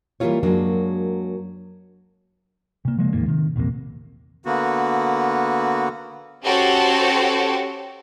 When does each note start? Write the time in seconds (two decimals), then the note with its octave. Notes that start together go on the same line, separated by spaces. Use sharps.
0.20 E3 G3 A#3 E4 F4 C#5
0.43 F#2 F#3 G#3 A#3 D4
2.85 C3 A#3
2.98 C#3 F3 G#3 A#3
3.13 A1 D#2 G#2 A#3
3.28 C3 D#3
3.56 A#1 E2 C3 A#3
4.46 D3 A#3 B3 F#4
6.44 C#4 F#4 G4 A4 C5 C#5